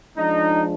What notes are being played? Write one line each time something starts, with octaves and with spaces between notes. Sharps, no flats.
F3 G#3 D4 D#4